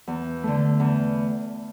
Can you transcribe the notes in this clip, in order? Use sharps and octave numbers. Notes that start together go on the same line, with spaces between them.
E2
D3 A3
E2